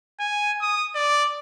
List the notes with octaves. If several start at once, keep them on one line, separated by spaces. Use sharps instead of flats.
G#5
D#6
D5